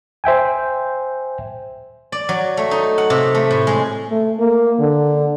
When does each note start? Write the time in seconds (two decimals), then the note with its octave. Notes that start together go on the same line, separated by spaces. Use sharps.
0.24 C5 E5 G5 G#5
2.12 D5
2.29 F#3
2.57 A3
2.71 D#4
2.98 F#5
3.10 C3
3.35 A3
3.51 A2
3.67 G#3
4.10 A3
4.40 A#3
4.80 D3